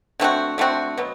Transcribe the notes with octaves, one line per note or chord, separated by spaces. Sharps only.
D3 A3 C4 F#4
D3 A3 C4 F#4
B2 F#3 B3